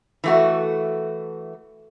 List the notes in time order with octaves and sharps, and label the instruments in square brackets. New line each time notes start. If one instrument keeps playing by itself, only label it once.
[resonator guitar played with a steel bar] E3 A3 F#4